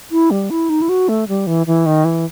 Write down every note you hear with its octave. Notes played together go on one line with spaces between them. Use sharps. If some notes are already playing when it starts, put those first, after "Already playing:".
E4
G3
E4
D#4
E4
F#4
A3
G3
E3
E3
D#3
E3